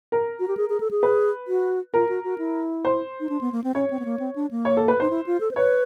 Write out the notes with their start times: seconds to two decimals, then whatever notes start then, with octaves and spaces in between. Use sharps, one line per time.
0.12 A#4
0.39 F#4
0.48 G4
0.57 G#4
0.69 G#4
0.80 A4
0.91 G#4
1.03 B4
1.48 F#4
1.94 F4 A#4
2.09 F#4
2.24 F#4
2.38 E4
2.85 C5
3.20 D#4
3.29 D4
3.41 B3
3.52 A#3
3.64 C4
3.75 C#4 C#5
3.90 C4
3.99 B3
4.05 A#3
4.19 C4
4.36 D4
4.51 A#3
4.65 C#5
4.77 A4
4.88 B4
5.00 D#4 C5
5.10 E4
5.26 F4
5.40 A4
5.51 C5
5.56 B4 C#5